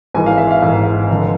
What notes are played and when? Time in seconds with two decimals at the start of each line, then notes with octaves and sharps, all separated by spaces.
0.14 G#1 G#2 E3 G#3 G#5
0.26 F5
0.38 E5
0.51 F5
0.62 G#1 G#2 E3 G#3
1.10 F1 F2 D3